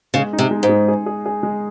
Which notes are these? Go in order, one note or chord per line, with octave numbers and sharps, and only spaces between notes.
C#3 G#3
D#4
C3
G#3
G#2
G#3
G#4
G#4
G#4
G#3